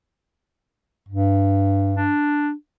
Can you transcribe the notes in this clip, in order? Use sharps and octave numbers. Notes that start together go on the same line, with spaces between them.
G2
D4